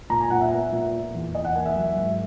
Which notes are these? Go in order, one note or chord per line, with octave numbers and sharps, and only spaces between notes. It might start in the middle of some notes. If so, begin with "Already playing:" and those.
A#2 A#5
G#5
A#2 F#5
E5
B3
A#2
A#3
E2
E2 D#5
F#5
A#3 G#5
E5
F#3
G#2